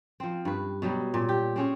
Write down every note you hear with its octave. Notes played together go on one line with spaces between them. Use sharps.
F3 C4
G2 B4
B2 F#3 G3
A#2
G4
C4 C#4 G#4